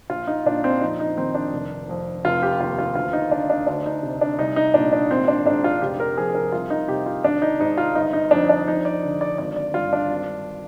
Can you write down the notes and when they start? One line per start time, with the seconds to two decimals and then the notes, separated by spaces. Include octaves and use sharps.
0.10 A#1 F4
0.27 D#4
0.45 A#2 D4
0.64 C4
0.81 F2 D#4
1.00 D#4
1.18 D#3 C4
1.35 D4
1.53 F1
1.89 F2
2.25 F1 F4
2.43 G4
2.60 D#2 F4
2.78 F4
2.95 D2 F4
3.13 D#4
3.31 D3 D4
3.50 D4
3.67 D2 D4
3.86 D#4
4.03 C3
4.21 D4
4.38 C2 D#4
4.56 D#4
4.74 A#2 D4
4.93 D4
5.11 G#1 C4
5.28 D4
5.45 G#2 D4
5.64 F4
5.81 F1 G4
6.00 A#4
6.18 F2 G#4
6.35 A#4
6.52 C2 F4
6.70 D#4
6.88 C3 G4
7.06 F4
7.24 G#1 D4
7.42 D#4
7.60 G#2 D#4
7.78 F4
7.95 G1 D#4
8.13 D#4
8.31 F2 D4
8.49 D4
8.68 F2 D#4
8.85 D5
9.03 D3
9.21 D5
9.38 G#1 D5
9.56 D5
9.74 G2 F4
9.93 D4
10.10 G#1